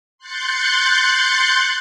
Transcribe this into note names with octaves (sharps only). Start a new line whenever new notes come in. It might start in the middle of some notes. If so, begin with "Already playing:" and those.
C6 F#6 G6 A6 C#7